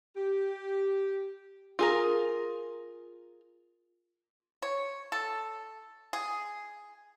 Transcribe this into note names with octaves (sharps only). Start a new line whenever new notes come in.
G4
F4 G#4 A#4
C#5
A4
G#4